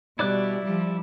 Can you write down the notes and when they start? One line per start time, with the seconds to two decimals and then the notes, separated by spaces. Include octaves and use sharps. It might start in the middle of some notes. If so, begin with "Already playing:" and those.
0.19 B2 G3 E4 D5 F#6
0.64 F3 G3